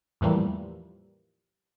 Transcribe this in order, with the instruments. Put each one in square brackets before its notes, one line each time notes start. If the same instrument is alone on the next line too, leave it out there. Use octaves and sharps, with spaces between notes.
[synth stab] E2 A2 E3 F3 G3 A#3